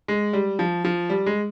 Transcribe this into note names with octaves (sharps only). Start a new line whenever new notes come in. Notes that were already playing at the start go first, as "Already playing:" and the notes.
G#3
G3
F3
F3
G3
G#3